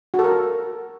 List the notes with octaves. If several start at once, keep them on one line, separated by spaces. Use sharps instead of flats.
F#4
A4
A#4